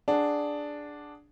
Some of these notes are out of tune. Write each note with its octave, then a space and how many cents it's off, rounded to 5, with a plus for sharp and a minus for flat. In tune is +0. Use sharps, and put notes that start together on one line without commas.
D4 +0 G#4 +0 F#5 +0